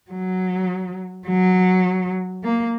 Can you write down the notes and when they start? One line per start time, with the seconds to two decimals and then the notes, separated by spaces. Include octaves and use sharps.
0.11 F#3
1.28 F#3
2.44 A#3